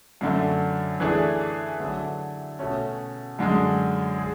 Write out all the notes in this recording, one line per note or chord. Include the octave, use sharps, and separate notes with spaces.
F#2 D3 A3
E3 A3 D4 G#4
D3 F#3 A3
B2 A3 C#4
F#2 D3 G#3
G#4